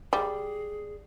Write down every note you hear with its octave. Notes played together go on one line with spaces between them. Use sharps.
G3 G#4